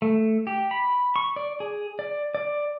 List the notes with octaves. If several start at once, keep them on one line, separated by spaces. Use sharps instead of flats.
A3
G4
B5
C#6
D5
G#4
D5
D5